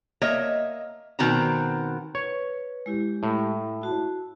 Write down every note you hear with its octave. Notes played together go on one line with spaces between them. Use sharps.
A#3 C#5 D#5 E5
B2 D#3 C4 F#4 C5 A#5
B4 C#5
G#3 E4 G4
A2
E4 F#4 A5